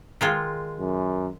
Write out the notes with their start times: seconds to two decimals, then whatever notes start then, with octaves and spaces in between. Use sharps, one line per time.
0.21 D#3 G#3 F4
0.79 F#2